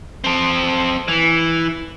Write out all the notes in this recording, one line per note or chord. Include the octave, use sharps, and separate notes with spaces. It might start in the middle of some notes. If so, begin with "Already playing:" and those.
C4 A4
E3